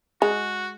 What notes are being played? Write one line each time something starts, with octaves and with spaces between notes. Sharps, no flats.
G#3 F#4